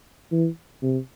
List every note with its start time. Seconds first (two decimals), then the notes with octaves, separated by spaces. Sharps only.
0.32 E3
0.83 C3